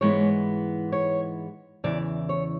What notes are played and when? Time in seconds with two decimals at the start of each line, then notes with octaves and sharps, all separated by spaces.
0.01 G#2 E3 G#3 B3 C#5
0.92 C#5
1.84 E2 C#3 E3 D5
2.29 C#5